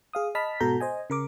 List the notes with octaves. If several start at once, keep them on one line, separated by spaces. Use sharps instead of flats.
G#4 F5 D#6
D#5 A5 B5 F6 B6
G#2 B2 F#4 A4 A#5 G6
C5 D#5 G#5
C#3 A#4 D6